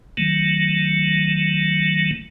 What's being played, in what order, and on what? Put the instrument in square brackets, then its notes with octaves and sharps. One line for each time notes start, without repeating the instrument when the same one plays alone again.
[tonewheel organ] D#3 F#3 A3